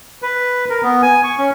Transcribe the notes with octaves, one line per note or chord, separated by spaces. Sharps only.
B4
A#4
B3
G#5
C#6
C#4